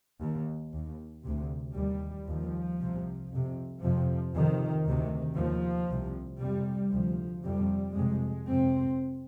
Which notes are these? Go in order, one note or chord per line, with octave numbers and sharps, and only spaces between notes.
D#2
D#2
D2 C3
D#2 G3
D#2 F3
C2 C3
F2 C3
F2 C3 F3
F2 C3 D#3
D2 C3 D#3
D#2 F3
C2 C3
F2 C3 G3
D2 C3 F3
F2 C3 G3
F2 C3 G#3
F2 C3 C4